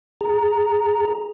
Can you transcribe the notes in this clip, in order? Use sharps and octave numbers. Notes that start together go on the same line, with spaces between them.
G#4 A#5